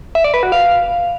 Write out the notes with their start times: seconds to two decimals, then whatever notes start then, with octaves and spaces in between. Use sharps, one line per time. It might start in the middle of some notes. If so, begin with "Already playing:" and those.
0.15 E5
0.24 D5
0.34 B4
0.43 F#4
0.52 F5